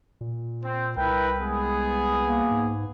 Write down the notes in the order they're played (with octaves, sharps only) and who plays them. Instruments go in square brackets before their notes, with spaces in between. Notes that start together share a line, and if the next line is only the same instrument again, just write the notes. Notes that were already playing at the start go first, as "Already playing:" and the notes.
[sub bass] A#2
[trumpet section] C4
[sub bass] C2 [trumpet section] E4 A#4 B4 [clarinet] G5
[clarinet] G#3 [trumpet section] B3 G#4
[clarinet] A#3
[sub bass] G#2